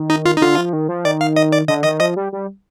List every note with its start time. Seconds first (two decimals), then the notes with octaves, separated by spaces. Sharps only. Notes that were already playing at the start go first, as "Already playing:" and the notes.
Already playing: D#3
0.10 D#4
0.25 F4
0.37 D#4
0.41 D3 F4
0.58 F3
0.73 D#3
0.89 F3
1.05 D#3 D5
1.21 F5
1.36 D#5
1.52 D5
1.68 D3 D#5
1.84 D#3 D#5
2.00 F3 D#5
2.16 G3
2.32 G3